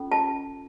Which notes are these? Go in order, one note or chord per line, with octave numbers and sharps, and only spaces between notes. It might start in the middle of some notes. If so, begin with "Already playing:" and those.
Already playing: C#4 F4 A4
A5